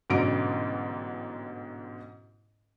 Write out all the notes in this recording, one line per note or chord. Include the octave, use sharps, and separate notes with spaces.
A1 G#2 B2 D3 F#3 D7